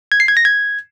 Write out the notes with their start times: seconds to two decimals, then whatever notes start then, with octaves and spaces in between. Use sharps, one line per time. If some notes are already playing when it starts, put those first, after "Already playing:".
0.12 G#6
0.20 C7
0.28 G#6
0.37 A#6
0.45 G#6